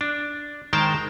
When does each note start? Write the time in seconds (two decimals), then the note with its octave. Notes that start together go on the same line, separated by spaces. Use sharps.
0.01 D4
0.73 D#3 G#3 A#4 C5 G5 A5